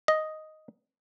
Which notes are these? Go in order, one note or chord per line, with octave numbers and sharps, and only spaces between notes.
D#5